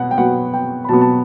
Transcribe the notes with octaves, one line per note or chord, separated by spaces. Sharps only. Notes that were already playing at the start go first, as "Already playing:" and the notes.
Already playing: B2 B3 F#5
G5
B2 F#3 B3 F#5
G5
B5
B2 F#3 B3 A5
A5